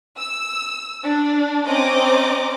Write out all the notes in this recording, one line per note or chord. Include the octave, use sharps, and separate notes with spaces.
E6
D4
C4 C#4 C5 D#5 A#5 D6